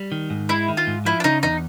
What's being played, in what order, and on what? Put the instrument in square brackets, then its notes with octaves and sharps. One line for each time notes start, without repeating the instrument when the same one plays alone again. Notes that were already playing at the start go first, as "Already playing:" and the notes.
Already playing: [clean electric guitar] G3
D#3
G#2
[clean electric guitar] G#3 [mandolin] E4
[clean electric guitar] D#3
[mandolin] F4
[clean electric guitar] G#2
[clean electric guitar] F3 [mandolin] E4
[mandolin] D4
[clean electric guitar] C#3 [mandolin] D#4
[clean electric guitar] E2 [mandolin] D#4